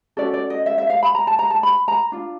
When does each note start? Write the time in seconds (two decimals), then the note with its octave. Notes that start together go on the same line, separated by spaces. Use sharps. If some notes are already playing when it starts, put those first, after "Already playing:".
0.17 C#4 F#4 A4 D5
0.34 D5
0.50 D#5
0.66 E5
0.78 E5
0.90 F5
1.03 B5
1.15 A#5
1.27 A5
1.39 A#5
1.50 A5
1.63 B5
1.88 A#5
2.12 D4 F4